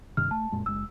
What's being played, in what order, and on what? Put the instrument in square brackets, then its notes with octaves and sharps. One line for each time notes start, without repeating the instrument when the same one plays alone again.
[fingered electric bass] G2 C3 D#3 [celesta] F6
[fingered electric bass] A3 [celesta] A5
[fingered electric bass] F#2 A#2 G#3
[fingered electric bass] F#1 G#3 [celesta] E6